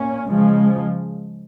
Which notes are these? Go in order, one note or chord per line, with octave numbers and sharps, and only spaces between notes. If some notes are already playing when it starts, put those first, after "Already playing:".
Already playing: A#2 C#4
C#3 F3 G#3